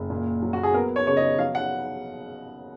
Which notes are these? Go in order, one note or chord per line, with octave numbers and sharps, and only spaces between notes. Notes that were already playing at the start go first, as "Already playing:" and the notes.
Already playing: F#1
A#2
F#3
F#4
G#4
B3 A#4
C#5
C#3 C#5
D#5
F#3 F5
F#5